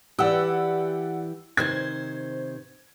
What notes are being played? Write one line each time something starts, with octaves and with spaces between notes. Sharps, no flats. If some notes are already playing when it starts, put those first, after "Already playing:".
E3 G4 D5 F#5 E6
C3 D#3 C5 G#6